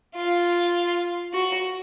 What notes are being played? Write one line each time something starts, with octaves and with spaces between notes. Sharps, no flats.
F4
F#4